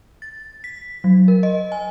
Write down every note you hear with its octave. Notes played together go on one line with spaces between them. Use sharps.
A6
B6
F#3
A#4
D#5
G#5